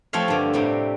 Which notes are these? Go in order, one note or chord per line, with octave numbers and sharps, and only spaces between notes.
F3 A3 C4 C#5 F5
G2 D3
A2 C3 G3